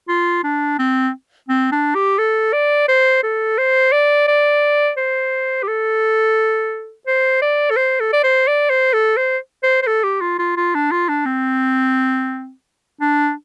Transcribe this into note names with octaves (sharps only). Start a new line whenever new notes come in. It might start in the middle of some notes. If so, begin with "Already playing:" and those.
F4
D4
C4
C4
D4
G4
A4
D5
C5
A4
C5
D5
D5
C5
G4
A4
C5
D5
A4
C5
A4
D5
C5
D5
C5
A4
C5
C5
C5
A4
G4
F4
F4
F4
D4
F4
D4
C4
D4